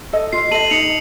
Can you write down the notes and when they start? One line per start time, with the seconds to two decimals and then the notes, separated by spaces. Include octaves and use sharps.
0.13 A4 D#5
0.33 F4 C7
0.51 A4 D#7 F#7
0.55 D#5
0.70 D#4 C#7 F7